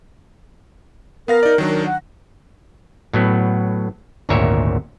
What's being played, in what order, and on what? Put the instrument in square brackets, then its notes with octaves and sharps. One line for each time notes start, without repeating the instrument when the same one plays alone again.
[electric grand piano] B3 F5 A#6 [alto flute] A#4
[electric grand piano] D#4 D5
D#3 F#3 D4
[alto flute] A#4
F#5
[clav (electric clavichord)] A2 F#3 B3
G#1 D2 A#2 A#4 C#5 E5